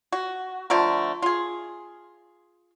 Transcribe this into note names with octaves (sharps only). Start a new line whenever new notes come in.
F#4
D3 F3 A3 A#4
F4 G#4